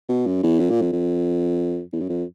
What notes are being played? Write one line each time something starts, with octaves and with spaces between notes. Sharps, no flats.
B2
F#2
E2
F2
A#2
F2
F2
E2
F#2
F2